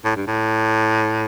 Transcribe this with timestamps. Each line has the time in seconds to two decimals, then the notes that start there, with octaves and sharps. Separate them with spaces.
0.04 A2
0.17 G2
0.27 A2